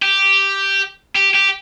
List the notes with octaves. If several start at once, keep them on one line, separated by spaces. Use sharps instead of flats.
G4
G4
G4